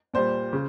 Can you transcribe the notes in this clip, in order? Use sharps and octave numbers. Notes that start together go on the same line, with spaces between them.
A#2 G3 C5
C#3